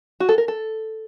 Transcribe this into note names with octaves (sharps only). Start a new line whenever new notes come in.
F#4
A4
A#4
A4